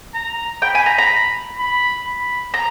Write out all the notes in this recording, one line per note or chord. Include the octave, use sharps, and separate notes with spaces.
A#5
G5 B5
G#5
A#5
A#5
B5
B5
A#5